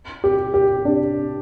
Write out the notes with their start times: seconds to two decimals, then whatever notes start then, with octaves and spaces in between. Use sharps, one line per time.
0.24 G4
0.54 G4
0.85 D4